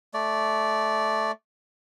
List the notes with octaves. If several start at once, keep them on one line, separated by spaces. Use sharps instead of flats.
A3 D5